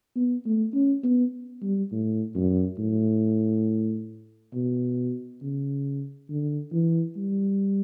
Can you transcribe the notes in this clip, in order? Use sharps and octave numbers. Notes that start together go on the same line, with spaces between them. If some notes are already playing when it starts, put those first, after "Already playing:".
B3
A3
C#4
B3
G3
A2
F#2
A2
B2
C#3
D3
E3
G3